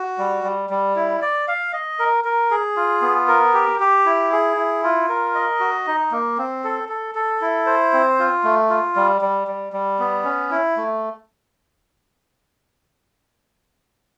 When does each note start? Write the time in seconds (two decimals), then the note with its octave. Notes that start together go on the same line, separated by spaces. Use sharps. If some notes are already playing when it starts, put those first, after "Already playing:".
Already playing: F#4
0.18 G3
0.44 G3
0.70 G3
0.96 E4
1.22 D5
1.48 F5
1.73 D#5
1.99 A#4
2.24 A#4
2.51 G#4
2.77 F4
3.02 B3
3.28 A#4
3.54 G4
3.80 G4
4.06 E4
4.32 G#4
4.57 E4
4.84 F4
5.09 A#4
5.35 D#5
5.60 F#4
5.87 D#4
6.12 A#3
6.38 C4
6.64 A4
6.89 A4
7.15 A4
7.42 E4
7.66 C5
7.93 C4
8.19 F4
8.44 A3
8.70 F4
8.96 G3
9.21 G3
9.48 G3
9.73 G3
9.99 B3
10.24 C#4
10.51 E4
10.77 A3